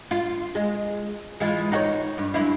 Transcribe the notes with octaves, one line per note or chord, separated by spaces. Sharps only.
F4
G#3
E3 G#3 F4
D#4 F#4 C#5
G2
F#2 E4 F5